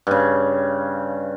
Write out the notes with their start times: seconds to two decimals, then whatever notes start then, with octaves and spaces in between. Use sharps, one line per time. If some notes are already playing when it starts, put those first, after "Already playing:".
0.07 G2 C#3